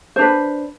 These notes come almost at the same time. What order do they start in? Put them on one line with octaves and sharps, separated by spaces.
C5 D4 B4